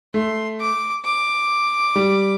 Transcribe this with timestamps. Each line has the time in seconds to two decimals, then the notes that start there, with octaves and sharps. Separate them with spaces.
0.14 A3 C6
0.60 D6
1.05 D6
1.96 G3